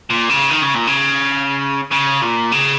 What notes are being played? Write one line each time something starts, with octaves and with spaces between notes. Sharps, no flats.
A#2
C#3
D#3
C#3
A#2
C#3
C#3
A#2
C#3